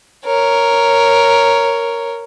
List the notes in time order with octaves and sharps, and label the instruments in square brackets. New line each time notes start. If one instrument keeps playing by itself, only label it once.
[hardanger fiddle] A#4 C#5